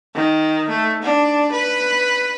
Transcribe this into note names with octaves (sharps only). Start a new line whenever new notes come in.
D#3
A3
D4
B4